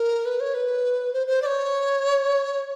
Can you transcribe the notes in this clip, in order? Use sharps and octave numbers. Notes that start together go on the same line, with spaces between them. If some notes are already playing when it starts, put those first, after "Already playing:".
Already playing: A#4
B4
C#5
B4
C5
C5
D5
C#5